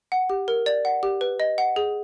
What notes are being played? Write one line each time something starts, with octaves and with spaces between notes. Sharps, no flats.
F#5
G4
A#4
D5
F#5
G4
B4
D#5
F#5
G#4